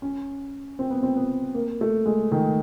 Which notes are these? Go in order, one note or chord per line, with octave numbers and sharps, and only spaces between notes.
C#4
C4
B3
C4
B3
A#3
A3
G#3
D#3